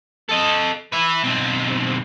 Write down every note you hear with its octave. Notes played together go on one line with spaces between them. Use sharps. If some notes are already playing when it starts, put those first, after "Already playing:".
A4 D#5
B4 E5
B1 C4